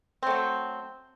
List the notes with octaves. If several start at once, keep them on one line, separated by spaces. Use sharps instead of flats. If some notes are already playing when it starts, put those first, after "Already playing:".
F#3 A3 C4